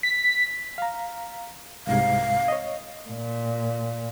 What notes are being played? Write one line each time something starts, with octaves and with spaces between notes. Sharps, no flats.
B6
F5 A#5
C2 G#2 C3 F5
C#5 D#5
A#2